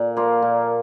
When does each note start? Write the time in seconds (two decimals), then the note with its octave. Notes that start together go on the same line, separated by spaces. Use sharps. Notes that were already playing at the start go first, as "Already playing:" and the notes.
Already playing: A#2
0.17 F3 A#3 F4
0.42 A#2